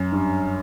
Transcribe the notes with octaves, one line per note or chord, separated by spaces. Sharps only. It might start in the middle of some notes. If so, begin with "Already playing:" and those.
Already playing: F#2
G2